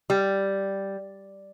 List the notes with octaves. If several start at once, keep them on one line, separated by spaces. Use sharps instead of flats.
G3